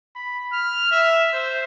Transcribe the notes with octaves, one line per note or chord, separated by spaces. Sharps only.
B5
F6
E5
C5